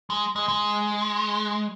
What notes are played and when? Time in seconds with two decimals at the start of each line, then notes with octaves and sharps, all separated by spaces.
0.10 G#3
0.36 G#3
0.49 G#3